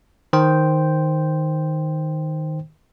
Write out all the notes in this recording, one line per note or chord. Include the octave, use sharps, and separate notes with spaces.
D#3 C5 G5